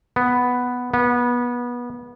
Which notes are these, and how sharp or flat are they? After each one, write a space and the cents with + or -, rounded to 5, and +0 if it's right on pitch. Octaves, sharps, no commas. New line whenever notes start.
B3 +0
B3 -25